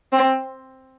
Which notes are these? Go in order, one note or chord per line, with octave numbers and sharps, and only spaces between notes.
C4